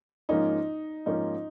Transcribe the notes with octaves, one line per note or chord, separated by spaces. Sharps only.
G#2 F3 A#3 C#4 D#4
G#2 F3 A#3 C#4 D#4